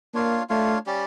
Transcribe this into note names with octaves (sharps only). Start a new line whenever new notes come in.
A#3 D4 F4 C#5 F5
A3 D4 F4 C#5 F5
G3 C#4 G4 D5